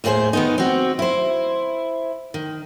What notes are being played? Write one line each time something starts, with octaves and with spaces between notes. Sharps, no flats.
D#2 A2 G#4 A#4 C5
D#3 B3 D#4
C4 F#4
E4 C5
D#3